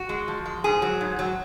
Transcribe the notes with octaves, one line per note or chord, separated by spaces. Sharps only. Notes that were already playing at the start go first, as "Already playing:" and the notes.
Already playing: F#4
G#3
F3
G#3
G#2 G#4
F#3
G#2
F#3